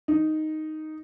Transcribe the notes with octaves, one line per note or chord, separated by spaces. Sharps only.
D#4